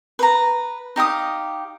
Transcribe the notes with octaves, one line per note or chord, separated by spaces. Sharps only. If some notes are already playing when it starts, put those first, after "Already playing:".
B4 A#5
D#4 G4 F5 D#6